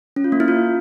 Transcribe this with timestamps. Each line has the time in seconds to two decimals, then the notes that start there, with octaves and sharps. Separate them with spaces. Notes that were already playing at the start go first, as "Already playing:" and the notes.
0.16 C#4
0.24 F4
0.32 A#3
0.40 E4
0.48 F4